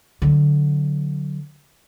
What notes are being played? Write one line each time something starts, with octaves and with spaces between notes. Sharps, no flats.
D3 F#3